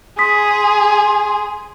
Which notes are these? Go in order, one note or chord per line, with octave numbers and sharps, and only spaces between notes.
G#4 C6 D#6 B6